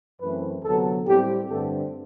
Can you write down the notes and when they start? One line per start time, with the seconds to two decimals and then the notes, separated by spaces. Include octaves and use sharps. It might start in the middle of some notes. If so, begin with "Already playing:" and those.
0.21 F#2 E3 A3 C4 B4
0.64 D2 C3 F#3 B3 A4
1.06 A2 G3 C4 G4
1.49 G2 D3 A3 C4 A4